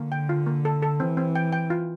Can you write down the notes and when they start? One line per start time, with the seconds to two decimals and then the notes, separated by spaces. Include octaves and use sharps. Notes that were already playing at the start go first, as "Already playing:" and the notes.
Already playing: D3 A#3
0.12 G5
0.29 F4
0.46 A#3
0.65 A4
0.82 A4
1.00 E3 C4
1.17 C4
1.35 G5
1.53 G5
1.70 F4